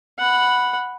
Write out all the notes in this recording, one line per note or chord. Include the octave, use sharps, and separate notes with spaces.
F#5 B5